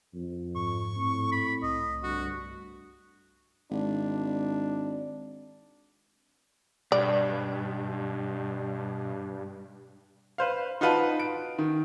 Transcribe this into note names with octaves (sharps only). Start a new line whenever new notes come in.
F2
G#2 C#6
A2 C4
B5
C2 D#5
D2 G2 F#4
G#1 D4
G2 B2 D5
B4 C5 F5
D#4 F4 F#4 B4 A5
D7
D#3